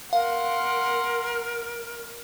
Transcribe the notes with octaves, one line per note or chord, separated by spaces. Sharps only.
A#4 F5 F#5 C6